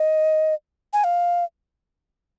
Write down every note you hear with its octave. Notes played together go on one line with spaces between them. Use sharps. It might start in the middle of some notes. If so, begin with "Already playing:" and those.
Already playing: D#5
G#5
F5